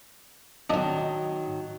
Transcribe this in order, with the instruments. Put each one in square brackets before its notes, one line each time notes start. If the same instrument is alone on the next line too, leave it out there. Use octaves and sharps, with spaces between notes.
[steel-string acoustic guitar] D#3 F#3 [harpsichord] D4 D#5